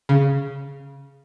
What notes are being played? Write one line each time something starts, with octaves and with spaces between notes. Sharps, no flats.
C#3